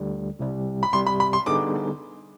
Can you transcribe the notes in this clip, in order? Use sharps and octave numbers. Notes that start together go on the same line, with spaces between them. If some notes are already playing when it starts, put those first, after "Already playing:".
Already playing: D2 D3 G3
C2 C3 G3
B5
C2 C3 G3 C6
B5
B5
C6
D3 G3 B3 D#4 G#4 D6